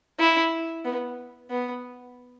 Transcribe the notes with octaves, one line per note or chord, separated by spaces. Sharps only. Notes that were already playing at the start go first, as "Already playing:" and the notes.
E4
B3
B3